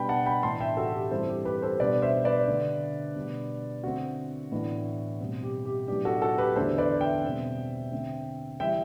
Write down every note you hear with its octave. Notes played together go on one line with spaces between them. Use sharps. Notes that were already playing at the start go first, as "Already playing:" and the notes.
Already playing: B2 G3 B3 D4 G5 B5
F#5 A5
G5 B5
A2 E3 B3 D4 A5 C6
E5 G5
F#4 A4
G4
G2 E3 G3 C4 A4 C5
G4
G4 B4
A4 C5
B2 G3 B3 D4 B4 D5
C5 E5
B4 D5
D3 A3 D4
B2 G3 D4
D3 A3 C4 F#4
A2 E3 B3 D4
B2 G3 C4
G4
G4
A2 F#3 B3 D4 G4
F#4 A4
F#4 A4
G4 B4
E2 D3 A3 D4 A4 C5
B4 D5
E5 G5
B2 G3 C4
D3 A3 C4
E3 G3 E5 G5